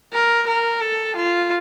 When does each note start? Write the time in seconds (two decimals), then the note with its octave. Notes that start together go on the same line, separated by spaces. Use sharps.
0.13 A#4
0.47 A#4
0.81 A4
1.16 F4